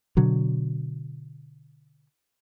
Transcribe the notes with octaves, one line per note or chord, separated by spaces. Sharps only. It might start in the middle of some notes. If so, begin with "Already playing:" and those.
B2 D3 F#3